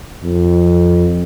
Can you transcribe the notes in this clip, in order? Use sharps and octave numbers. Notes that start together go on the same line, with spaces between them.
F2